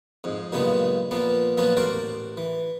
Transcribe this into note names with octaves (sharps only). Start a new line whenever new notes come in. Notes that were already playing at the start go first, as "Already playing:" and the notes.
F2 G#2
G2 A#2 C#3 F#3 G#3 B3
A#2 F3 A#3 B3
A#2 F3 F#3 B3 C#4 F#4
A1 F#4 A#4 C5 D5 D6
E3